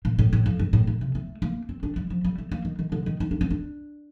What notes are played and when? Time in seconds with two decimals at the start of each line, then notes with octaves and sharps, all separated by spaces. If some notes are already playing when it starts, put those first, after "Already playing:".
0.05 A#2
0.19 A2
0.33 A2
0.46 F2
0.59 G2
0.73 A2
0.87 A#2
1.01 C3
1.15 A3
1.42 A#3
1.69 C4
1.83 D4
1.96 G3
2.10 F3
2.25 G3
2.38 A3
2.51 A#3
2.65 D#3
2.79 D#3
2.92 D3
3.06 D#3
3.20 D#4
3.31 D4
3.41 C4
3.51 D4